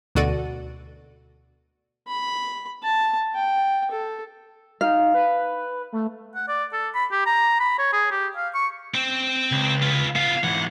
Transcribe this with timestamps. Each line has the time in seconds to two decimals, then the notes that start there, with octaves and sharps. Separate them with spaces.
0.15 D2 B2 F#4 A4 D5 D#7
2.08 B5
2.83 A5
3.35 G5
3.91 A4
4.81 D#4 F5
5.14 B4
5.93 A3
6.35 F#5
6.48 D5
6.73 A4
6.95 B5
7.12 G4
7.26 A#5
7.60 B5
7.78 C#5
7.93 G#4
8.11 G4
8.36 F5
8.54 C#6
8.94 C4
9.52 C#2
9.82 F4 B4
10.16 B3 F4 F5
10.44 G#2 E3 F#5